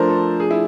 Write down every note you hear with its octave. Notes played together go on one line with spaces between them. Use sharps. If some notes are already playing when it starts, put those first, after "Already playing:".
Already playing: F3 A3 D4 A#4 C5
A4
G#4
E4